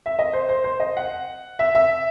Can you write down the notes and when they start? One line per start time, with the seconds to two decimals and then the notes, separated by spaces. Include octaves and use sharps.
0.06 E5
0.19 D#5
0.33 C5
0.49 C5
0.64 C5
0.80 D#5
0.97 F#5
1.59 E5
1.75 E5